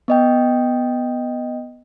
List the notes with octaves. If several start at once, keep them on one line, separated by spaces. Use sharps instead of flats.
B3 D#5 G5